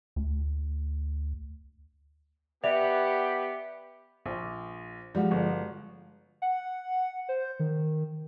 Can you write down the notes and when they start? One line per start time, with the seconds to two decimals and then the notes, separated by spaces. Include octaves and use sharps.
0.16 D2
2.64 B3 G4 D5 E5 F7
4.26 A#1
5.15 F3 G3 G#3 F#4
5.31 G1
6.42 F#5
7.29 C5
7.60 D#3